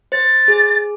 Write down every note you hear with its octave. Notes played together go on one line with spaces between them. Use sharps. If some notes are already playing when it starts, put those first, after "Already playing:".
C5 A6
G#4